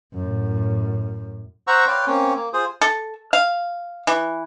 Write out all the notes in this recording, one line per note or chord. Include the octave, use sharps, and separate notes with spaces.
F#2 A2
C5 F#5 A#5 C#6 E6
B4 C#5 D5 F5 G5 C6
A#3 C4 C#4 C#5
A#3
F4 G#4 C5 D#6
A4
F5
E3